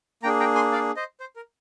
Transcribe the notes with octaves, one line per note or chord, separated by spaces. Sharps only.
A#3 D4 G#4 G5 A#5
G5 A#5
G#5 C6
D5 F5
C5 D#5
C5
A#4